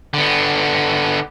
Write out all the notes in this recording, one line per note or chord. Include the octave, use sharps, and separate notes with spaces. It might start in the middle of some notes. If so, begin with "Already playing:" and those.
D3 B3